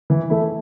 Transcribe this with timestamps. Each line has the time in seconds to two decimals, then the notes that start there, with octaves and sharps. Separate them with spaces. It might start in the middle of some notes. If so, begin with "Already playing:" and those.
0.10 E3
0.30 A3 E4